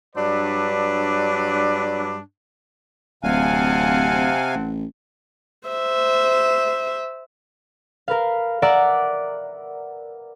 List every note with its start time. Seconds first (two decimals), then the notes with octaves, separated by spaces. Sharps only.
0.16 G2 F#3 D4 B4 D5
3.23 D1 C3 C4 F5 F#5 G#5 A5
4.55 A1
5.68 C5 E5
8.08 A#4 B4 F5
8.62 A#4 D5 E5 F#5 A#5 E6